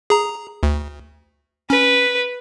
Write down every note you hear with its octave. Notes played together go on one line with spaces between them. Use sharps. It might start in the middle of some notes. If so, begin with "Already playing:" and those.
G#4 A#5
D2
C#4 B4